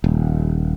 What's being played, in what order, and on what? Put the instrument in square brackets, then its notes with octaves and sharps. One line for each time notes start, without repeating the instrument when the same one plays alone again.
[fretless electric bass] D#1